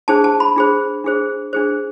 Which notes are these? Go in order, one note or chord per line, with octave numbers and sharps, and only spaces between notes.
D4 G#4 C5 A5
A5
B5
D4 G#4 C5
D4 G#4 C5
D4 G#4 C5